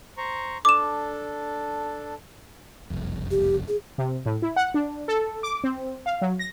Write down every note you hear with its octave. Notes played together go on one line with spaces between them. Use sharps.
C5 A#5 C#6
D4 A4 D6 E7
F#1 C2 F2
G4
G#4
C3
A2
E4
F#5
D4
A4
D6
C4
F5
F#3
A#6